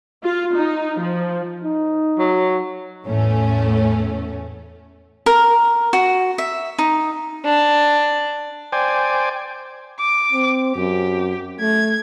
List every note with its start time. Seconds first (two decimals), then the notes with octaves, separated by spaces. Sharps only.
0.24 F4
0.55 D#4
1.00 F3
1.64 D#4
2.19 F#3
3.06 E2 A2 A3 C#4
5.26 A#4
5.93 F#4
6.38 E5
6.79 D#4
7.44 D4
8.72 C5 D5 G5 G#5
10.00 D6
10.32 C4
10.76 F#2 G4
11.60 A3 G#6